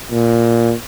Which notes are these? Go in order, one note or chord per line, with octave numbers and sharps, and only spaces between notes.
A#2